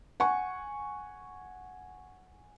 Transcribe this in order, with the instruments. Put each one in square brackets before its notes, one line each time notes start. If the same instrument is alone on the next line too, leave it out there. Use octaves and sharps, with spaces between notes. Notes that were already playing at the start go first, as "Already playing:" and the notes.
[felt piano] F#5 G#5 C#6